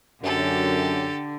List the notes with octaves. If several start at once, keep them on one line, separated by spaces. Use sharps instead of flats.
F#2 D3 G4 A4